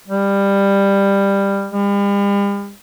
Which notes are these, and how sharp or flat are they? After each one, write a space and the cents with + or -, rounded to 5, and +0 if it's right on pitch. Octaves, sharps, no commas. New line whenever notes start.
G3 +15
G3 +45